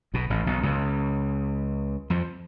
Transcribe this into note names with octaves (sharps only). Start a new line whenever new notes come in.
B1 B2
A1 A2
B1 B2
C#2 C#3
F2 F3